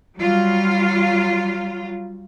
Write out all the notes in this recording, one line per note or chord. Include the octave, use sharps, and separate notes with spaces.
F#3 G3 F4